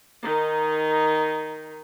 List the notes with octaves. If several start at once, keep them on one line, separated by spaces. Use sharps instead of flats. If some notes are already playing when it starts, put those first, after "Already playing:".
D#3 D#4